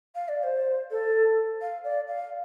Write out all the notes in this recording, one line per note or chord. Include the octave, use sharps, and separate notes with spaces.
F5
D5
C5
A4
F5
D5
F5